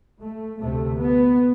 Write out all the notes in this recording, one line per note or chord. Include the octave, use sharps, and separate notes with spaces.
A3
D2 C3 A3
B3